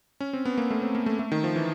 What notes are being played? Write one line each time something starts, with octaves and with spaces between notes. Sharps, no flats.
C#4
C4
B3
A#3
A3
C4
A#3
A3
A3
D#3
F3
E3